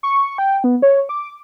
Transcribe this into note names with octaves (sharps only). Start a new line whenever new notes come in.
C#6
G5
B3
C#5
D6